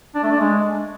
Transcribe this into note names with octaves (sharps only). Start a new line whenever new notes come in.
D4
A3
D4
G#3